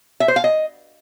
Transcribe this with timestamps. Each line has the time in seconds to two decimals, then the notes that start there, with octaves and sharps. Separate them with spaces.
0.20 E5
0.28 C5
0.36 F5
0.44 D#5